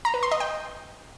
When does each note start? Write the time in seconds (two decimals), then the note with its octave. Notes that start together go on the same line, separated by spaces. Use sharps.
0.05 A#5
0.14 B4
0.23 C6
0.32 D#5
0.40 G5